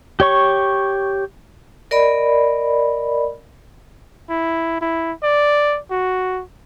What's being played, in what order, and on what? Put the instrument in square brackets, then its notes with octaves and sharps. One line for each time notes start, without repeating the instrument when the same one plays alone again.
[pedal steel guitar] G4 C#5 C#6
[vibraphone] A#4 D5 D#5 B5
[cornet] E4
E4
D5
F#4